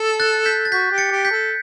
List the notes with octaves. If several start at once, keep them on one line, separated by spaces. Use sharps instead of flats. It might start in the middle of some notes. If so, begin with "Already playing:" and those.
Already playing: A4
F#6 A6
G6 B6
A6
F#4 G6 B6
G4
A6 C#7
G4
G6 B6
A4